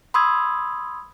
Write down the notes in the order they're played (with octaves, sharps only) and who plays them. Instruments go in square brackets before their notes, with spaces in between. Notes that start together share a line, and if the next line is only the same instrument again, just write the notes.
[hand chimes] B5 C6 D#6 E6 G#6